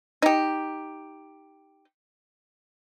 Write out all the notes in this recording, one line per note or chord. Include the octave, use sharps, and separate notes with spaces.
D#4 G4